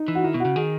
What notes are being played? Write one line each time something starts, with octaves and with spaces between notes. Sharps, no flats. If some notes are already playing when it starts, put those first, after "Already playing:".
Already playing: D#4
E3
F#4
D#3 E4
B2
C#3 F#4
D#3 G#4